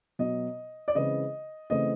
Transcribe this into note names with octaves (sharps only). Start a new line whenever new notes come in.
B2 F#3 B3 D#5
D5
C#3 E3 G#3 C4 D#5
C#3 E3 A3 C4 D#5